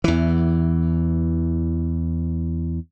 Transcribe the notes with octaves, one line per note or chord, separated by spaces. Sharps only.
E2 E3